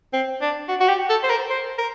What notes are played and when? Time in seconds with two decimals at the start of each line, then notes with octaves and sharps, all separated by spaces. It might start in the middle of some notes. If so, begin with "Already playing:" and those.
0.13 C4
0.42 D4
0.68 F#4
0.80 F#4
0.88 G4
1.10 A4
1.23 C5
1.30 A#4
1.50 C5
1.78 A#4